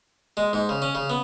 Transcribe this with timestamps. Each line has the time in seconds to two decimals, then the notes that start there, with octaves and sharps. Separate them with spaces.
0.37 G#3
0.53 G#2
0.69 C#3
0.82 C#4
0.95 C#3
1.10 B3